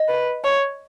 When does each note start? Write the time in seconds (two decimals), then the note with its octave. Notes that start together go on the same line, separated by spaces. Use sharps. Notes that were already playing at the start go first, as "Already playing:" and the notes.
Already playing: D#5
0.08 B4
0.44 C#5